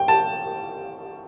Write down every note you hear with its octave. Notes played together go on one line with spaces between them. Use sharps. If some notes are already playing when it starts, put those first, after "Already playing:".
Already playing: G5
A5